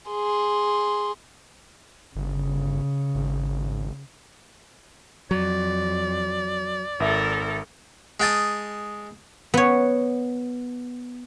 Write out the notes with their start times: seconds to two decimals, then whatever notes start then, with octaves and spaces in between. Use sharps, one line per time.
0.10 G#4 C6
2.16 G1 C#3
3.15 G#1
5.31 F2 F#3 D5
7.00 G#1 A4 A#4 E5
8.20 G#3 G5 A5 D#6
9.54 B3 C#5